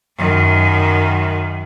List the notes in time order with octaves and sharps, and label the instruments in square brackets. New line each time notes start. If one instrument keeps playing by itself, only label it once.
[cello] F#2 D#3